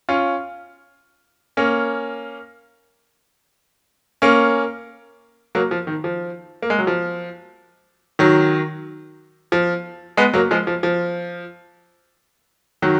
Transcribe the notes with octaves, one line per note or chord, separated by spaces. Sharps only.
C#4 F4
A#3 C#4
A#3 C#4
F#3 A#3
F3
D#3
F3
A#3
G#3
F#3
F3
D#3 F#3
F3
G#3 B3
F#3 A#3
F3 G#3
F3
F3
D#3 F#3